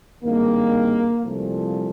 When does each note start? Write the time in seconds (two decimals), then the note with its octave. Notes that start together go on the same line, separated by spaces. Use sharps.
0.23 G#1 G2 D#3 G#3 A#3
1.21 C2 A#2 F3 A3